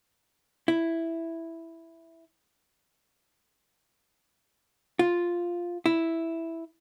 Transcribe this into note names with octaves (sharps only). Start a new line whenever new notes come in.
E4
F4
E4